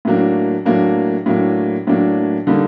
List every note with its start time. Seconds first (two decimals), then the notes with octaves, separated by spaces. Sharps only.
0.05 A2 F#3 A#3 D4
0.66 A2 F#3 A#3 D4
1.26 A2 F#3 A#3 D4
1.87 A2 F#3 A#3 D4
2.47 D3 G3 A#3 D#4